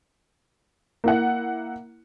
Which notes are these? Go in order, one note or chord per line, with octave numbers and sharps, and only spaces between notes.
A#3 E4 F#5